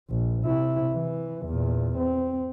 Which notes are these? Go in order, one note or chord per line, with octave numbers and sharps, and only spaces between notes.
A#1
C3 E4
E3
E2 A#2
C4